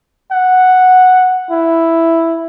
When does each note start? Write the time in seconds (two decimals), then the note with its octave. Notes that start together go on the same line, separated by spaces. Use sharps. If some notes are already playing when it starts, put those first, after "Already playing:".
0.32 F#5
1.51 E4